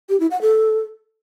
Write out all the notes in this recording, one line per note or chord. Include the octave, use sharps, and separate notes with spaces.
G4
E4
F#5
A4